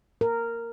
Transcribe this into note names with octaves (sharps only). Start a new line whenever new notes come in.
A#4